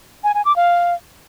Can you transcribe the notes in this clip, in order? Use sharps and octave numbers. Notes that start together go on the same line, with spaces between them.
G#5
G#5
D6
F5